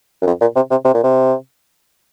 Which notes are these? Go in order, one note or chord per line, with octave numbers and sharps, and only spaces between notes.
F#2
F2
A#2
C3
C3
C3
A#2
C3